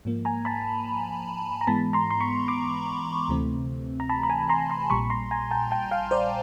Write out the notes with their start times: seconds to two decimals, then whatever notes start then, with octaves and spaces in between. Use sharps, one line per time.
0.05 G#2 F3 A#3
0.25 G#5 A#5
0.45 A5 B5
1.61 A#5
1.67 G#2 E3 G#3 B3 A5 B5
1.93 A#5 C6
2.11 C6
2.20 B5 C#6
2.48 C6 D6
3.28 D2 C3 E3 A3 C4
4.00 A#5
4.09 A5 B5
4.23 B5
4.30 G#5 A#5
4.49 A#5 C6
4.70 A#5 C6
4.90 A#1 A#2 G3 B5 C#6
5.10 A#5 C6
5.31 G#5 A#5
5.51 G5 A5
5.71 G5 A5
5.91 F5 G5
6.11 C5 D5